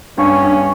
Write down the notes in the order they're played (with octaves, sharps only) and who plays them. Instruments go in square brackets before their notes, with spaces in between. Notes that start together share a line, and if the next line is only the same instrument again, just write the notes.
[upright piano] G2 [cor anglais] C#4
[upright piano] G2